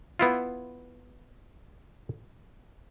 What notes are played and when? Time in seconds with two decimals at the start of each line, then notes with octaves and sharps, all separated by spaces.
0.19 B3 E4 F4